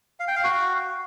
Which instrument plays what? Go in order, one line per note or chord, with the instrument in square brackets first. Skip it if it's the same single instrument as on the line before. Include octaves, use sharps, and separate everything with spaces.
[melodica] F5
G5
F5
F#4